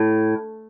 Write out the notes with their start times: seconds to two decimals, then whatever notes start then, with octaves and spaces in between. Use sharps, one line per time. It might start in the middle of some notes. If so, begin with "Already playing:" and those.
Already playing: A2